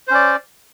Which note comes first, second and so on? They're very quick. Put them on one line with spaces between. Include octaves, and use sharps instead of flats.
C5 C#4 D5